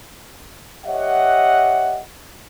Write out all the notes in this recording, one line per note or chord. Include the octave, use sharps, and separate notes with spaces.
G4 C#5 D#5 E5 F#5